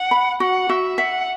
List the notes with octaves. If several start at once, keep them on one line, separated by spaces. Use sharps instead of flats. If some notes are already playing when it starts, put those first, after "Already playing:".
Already playing: F#5
B5
F#4 F#5
F#4 E5
E5 F#5